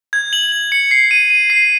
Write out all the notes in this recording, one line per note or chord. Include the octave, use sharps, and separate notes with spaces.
G#6
F#7
F#7
C#7
C7
D#7
D#7
C7